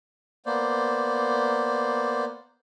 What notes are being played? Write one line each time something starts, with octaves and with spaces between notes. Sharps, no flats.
A#3 B3 C5 D5